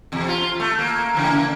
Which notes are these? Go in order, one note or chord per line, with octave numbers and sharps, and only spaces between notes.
E2 C3
F4
A3
A#3
C#3 E3 A#3